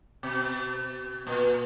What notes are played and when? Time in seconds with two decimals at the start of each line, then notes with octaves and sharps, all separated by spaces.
0.23 B2
1.27 A#2